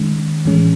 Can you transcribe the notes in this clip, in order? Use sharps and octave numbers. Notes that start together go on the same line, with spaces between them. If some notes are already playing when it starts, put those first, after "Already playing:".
Already playing: D#3 G#3 C#4
A2 E3 G#3 C#4